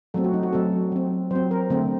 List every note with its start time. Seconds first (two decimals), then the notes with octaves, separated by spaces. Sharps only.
0.14 F#3 A3 C4 A4
0.24 F#4
0.33 D#4
0.43 F#4
0.53 F#3 A3 C4 A4
0.92 F#3 C4
1.31 F#3 C4 C5
1.51 A#4
1.70 D3 A3 C4